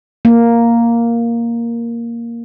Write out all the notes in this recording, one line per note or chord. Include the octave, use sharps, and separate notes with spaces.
A#3